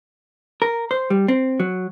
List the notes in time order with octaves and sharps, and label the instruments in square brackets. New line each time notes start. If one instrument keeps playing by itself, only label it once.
[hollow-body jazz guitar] A#4
C5
G3
C4
F#3